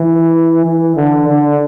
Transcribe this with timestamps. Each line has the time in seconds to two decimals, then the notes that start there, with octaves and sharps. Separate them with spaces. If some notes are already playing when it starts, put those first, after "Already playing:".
Already playing: E3
0.65 E3
0.96 D3
1.28 D3